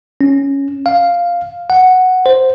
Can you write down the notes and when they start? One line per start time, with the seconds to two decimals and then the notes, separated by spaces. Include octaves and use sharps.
0.21 C#4
0.86 F5
1.70 F#5
2.26 C5